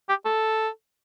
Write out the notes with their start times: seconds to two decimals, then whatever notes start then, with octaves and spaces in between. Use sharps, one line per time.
0.09 G4
0.25 A4